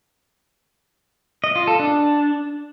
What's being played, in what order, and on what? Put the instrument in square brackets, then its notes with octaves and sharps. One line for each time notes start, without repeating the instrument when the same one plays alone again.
[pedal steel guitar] D#5
F4
A4
D4